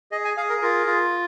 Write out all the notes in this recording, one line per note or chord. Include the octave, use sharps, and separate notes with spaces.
G#4 D#5
G#5
G#4 F5
A#4
F4 A#4
F4